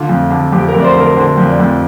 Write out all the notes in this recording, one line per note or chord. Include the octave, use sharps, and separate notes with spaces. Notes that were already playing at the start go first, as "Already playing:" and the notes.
Already playing: D3 F4
F2
D3
F2 G4
A#4
F2
D5
C5
D3
A#4
D3 C5
F2
D5
F2